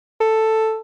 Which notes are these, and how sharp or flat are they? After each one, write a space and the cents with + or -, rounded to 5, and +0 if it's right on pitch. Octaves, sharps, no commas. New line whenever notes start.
A4 +5